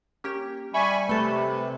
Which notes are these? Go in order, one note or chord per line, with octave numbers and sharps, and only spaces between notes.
A#3 C#4 G4
G3 E5 G#5 B5 C#6
C3 A3 A4 B4